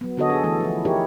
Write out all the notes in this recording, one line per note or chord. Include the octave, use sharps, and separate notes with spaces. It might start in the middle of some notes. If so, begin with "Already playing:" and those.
F#3 B3
D3 B3 F#4 A4 C#5 D#5
G#4 A4
E3 A3 A4
F3 E4
D#4 E4 G4 G#4 A#4 C#5